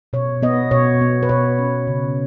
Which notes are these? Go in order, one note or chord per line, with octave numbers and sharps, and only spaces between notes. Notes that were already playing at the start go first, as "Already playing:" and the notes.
B2 C#5
B3 D#5
B2 C#5
B3
B4
B2 C#5
C#4
C#3